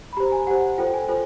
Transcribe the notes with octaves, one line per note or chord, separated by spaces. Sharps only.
B5
G4 C5 A#5
G#5
G4 C5 F#5
F4 A4 C5 G5
G#5
F4 A4 C5